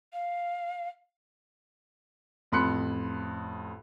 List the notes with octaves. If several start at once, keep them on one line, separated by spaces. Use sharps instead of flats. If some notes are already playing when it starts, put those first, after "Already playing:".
F5
A1 F2 B5 C6 F#6 C#7